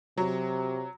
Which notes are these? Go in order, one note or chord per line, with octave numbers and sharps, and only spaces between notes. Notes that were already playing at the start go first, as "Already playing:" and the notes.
C3 F#3